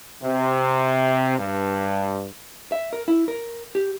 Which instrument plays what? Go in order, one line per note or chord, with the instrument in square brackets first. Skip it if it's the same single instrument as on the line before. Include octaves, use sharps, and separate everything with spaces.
[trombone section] C3
G2
[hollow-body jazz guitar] E5
A#4
E4
A#4
G4